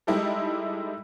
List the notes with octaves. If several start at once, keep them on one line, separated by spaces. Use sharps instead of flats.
G3 G#3 D#4 E4 G4 A4